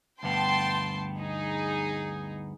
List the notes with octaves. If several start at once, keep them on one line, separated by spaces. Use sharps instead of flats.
D2 G2 B3 G5 A5 C6
D#4 G#4